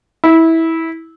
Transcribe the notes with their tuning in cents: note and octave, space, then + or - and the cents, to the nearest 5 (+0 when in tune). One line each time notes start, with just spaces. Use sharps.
E4 -20